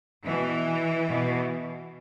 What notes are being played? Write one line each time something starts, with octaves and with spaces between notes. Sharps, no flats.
B2 E3
B2